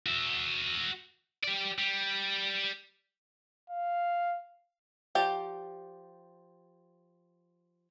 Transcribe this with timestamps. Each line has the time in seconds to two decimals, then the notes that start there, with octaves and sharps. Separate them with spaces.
0.07 F#4 E5
1.43 G4 D5
1.78 G3
3.70 F5
5.15 F3 G4 D5